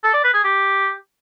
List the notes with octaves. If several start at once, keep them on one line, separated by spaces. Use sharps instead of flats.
A4
D5
B4
G#4
G4